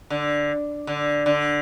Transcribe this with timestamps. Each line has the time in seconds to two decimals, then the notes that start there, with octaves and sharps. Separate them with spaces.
0.10 D3
0.87 D3
1.26 D3